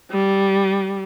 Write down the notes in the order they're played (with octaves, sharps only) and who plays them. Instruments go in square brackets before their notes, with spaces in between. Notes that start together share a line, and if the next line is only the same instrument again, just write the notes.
[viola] G3